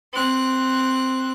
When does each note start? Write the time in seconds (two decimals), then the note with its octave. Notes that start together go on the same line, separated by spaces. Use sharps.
0.13 C4 F#6